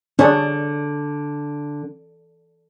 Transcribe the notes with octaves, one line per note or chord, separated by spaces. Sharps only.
D3 D4 G#4 C#5